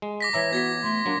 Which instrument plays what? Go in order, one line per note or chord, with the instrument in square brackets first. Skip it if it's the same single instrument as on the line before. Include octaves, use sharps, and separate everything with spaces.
[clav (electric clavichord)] G#3
[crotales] D6 A#6 B6
[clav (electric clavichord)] E3 E5 A#5 [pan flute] C#5
[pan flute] B3 [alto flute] F#4 [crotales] G#6 A#6 B6
[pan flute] A3 [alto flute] C6
[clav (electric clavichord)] F#3 A#3 [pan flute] D4